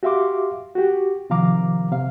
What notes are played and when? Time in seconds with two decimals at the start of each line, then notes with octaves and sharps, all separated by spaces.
0.03 F#4 G4 E5 F5 C6 D6
0.75 F#4 G4
1.30 C3 D#3 F3 F5 A#5 D6
1.92 C3 F5